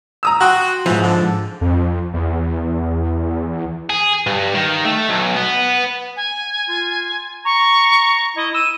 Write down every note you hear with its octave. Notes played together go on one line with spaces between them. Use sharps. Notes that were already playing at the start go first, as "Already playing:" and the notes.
A#5 D#6 E6
F#4 G5 C6 F#6
G#2 E3 F3
D3
F2
E2
G#4
G2
D#3
A3
B1
B3
G#5
F4
A#5 C#6
E4 D#5
E6 D#7